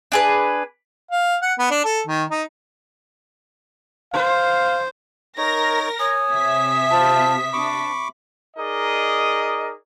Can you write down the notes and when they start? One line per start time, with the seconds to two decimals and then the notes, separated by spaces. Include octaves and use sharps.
0.12 D4 G#4 B4
1.11 F5
1.42 F#5
1.59 B3
1.71 D4
1.85 A4
2.07 D#3
2.30 D#4
4.14 C5 F5
5.38 D#4 A#4 C#5 A#6
5.99 C#5 G#5 D#6
6.30 C3 E5 B6
6.90 F4 C5 A5
7.53 D4 B5 C#6 D6
8.57 D#4 G#4 A#4 D5 D#5